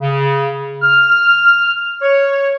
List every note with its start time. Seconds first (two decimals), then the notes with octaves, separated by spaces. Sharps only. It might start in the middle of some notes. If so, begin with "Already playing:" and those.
0.01 C#3
0.82 F6
2.01 C#5